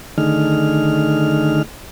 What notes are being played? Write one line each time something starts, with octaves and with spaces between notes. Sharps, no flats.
D3 D#3 A3 D#4 G#4 F6